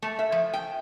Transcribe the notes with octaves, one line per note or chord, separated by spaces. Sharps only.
A3
E5
F3
G5